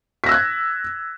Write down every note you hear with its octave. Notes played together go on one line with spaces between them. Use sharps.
E6 F#6 G#6 A#6 B6